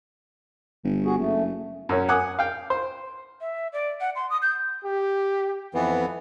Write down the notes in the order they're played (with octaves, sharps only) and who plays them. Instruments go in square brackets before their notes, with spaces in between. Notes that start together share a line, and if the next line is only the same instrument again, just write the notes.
[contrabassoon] G1
[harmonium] F#4 G#4
[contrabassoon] F#1 [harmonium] A3
[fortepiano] F#2 C#4
F#5 G#5 D6 D#6
F5 G5
C5
[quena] E5
D5
F#5
C6
D#6
G6
[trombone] G4
[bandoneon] F2 E3 B3 [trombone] B4